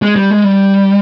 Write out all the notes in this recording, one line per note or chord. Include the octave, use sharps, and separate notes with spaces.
G#3
G3
G#3
G3